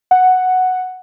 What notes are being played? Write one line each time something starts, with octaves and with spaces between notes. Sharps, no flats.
F#5